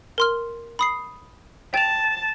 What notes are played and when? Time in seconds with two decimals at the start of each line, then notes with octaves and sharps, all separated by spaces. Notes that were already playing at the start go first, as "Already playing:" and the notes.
0.18 A#4 C6 F6
0.79 B5 D#6 C7
1.74 G5 A5 F7